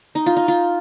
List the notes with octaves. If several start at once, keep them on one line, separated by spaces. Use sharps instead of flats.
D#4
F4
D#4
F4